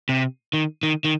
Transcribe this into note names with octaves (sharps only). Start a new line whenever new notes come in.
C3
D#3
D#3
D#3